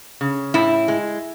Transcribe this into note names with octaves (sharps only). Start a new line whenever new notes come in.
C#3
A2 E4
G#3